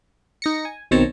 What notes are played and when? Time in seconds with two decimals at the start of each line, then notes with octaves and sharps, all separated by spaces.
0.42 D#4 A#6 C#7
0.65 G#5
0.91 B1 D#3 C4 C#5 A5 A#5